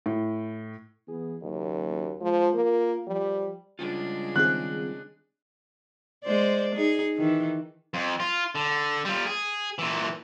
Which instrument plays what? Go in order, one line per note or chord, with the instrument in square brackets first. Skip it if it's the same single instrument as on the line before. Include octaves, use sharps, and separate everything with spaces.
[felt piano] A2
[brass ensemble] E3 B3 G#4
[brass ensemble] F#1 F#3 [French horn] D#2
[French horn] F3 [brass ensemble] G#3 F4 C5
[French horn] A#3 [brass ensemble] F4 A#4
[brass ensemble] F3 [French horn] G3
[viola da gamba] C#3 G#3 D4 [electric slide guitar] G3 F4
[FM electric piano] D#3 C4 G#4 [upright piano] F#6
[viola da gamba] G#3 C5 D5
D#4 G#4
D#3 E3
[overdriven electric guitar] F2
F4
D3
G3 F4
G#4
A#2 E3